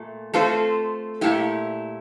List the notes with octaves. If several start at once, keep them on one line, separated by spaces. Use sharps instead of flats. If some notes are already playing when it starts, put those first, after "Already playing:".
Already playing: A#2 A3
A3 C4 F4 A4 C5
A#2 A3 E4 G4